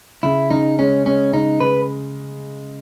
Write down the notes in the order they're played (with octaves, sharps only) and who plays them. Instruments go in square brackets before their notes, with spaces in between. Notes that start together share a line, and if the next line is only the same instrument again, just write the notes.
[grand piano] C#3 [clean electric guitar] E4
[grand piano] C#3 [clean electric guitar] D#4
[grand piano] G#3 [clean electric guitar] C#4
[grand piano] G#3 [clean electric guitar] C#4
[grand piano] C#3 [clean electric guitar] D#4
[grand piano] C#3 [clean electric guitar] B4